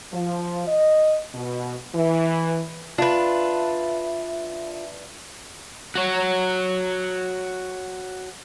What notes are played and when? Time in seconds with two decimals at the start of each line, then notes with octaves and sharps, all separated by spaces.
0.13 F3
0.68 D#5
1.35 B2
1.95 E3
2.98 D4 F4 B4 E5
5.95 F#4 C#5